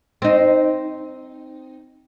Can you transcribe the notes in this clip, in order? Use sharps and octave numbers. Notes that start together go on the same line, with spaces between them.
C4 D#4